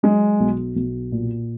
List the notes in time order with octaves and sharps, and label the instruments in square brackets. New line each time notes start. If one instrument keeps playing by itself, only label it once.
[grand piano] F#3 [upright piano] G#3
[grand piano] B1
B1
A#2